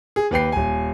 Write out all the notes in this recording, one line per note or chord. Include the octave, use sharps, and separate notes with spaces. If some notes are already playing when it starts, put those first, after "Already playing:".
G#4
D#2 B4 G5 C7
D#1 G#5